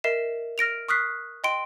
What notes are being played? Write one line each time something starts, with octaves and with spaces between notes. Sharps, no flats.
A#4 D#5 E5 C7 E7
F6 A#6 D7 F7
C#6 D#6 F6 F#6 B6 C7
D#5 G5 C6 D7